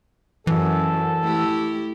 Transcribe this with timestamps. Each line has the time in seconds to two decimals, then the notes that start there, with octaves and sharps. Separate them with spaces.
0.47 F#2 E3 A4
1.23 A3 E4 G4